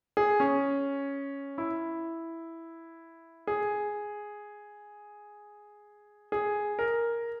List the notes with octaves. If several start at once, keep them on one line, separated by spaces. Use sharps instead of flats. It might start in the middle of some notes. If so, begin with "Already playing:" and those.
G#4
C#4
E4
G#4
G#4
A#4